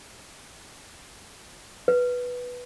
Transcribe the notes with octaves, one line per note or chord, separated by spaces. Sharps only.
B4